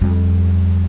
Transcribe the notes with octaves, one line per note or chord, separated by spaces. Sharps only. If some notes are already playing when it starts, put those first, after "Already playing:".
F2 G3